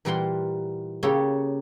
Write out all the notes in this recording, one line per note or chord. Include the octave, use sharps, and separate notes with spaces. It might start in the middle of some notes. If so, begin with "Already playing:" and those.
A#2 E3 G3 A#4 F#5 C6
C#3 A#3 G4 A4 C#5